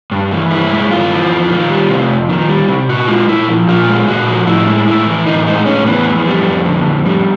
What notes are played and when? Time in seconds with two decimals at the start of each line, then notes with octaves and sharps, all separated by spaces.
0.12 G2
0.31 E3
0.51 G2 E4
0.71 G#3
0.90 G2 F4
1.11 E3
1.30 F2
1.49 D#3
1.69 G3
1.89 C3
2.09 F2
2.29 D#3
2.48 G3
2.68 C3
2.89 A#2 F#4
3.08 G#3 F4
3.28 A#2 E4
3.48 F3
3.68 A#2 F4
3.87 G#3
4.08 A#2 F#4
4.28 F3
4.47 A2 E4
4.67 G#3
4.87 A2 E4
5.07 E3
5.26 A2 D#4
5.46 G#3 D#4
5.66 A2 C#4
5.86 E3 B3
6.06 F2
6.26 G3
6.45 F2
6.65 D3
6.85 F2
7.06 G3